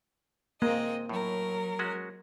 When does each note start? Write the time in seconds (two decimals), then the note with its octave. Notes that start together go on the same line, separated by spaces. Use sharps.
0.62 G#3 A#3 C4 D#5
1.09 A2 F#3 A#4
1.79 G#3 C#4 F#4